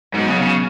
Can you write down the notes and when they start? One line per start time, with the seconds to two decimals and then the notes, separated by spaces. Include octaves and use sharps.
0.14 G#2 F#3 B3 F#4
0.28 C#3
0.42 C#3